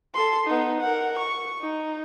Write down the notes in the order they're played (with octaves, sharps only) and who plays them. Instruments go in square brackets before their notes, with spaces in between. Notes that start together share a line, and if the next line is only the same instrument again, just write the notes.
[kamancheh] A4 C6
B3 D#4
A#4 F#5
C#6
D#4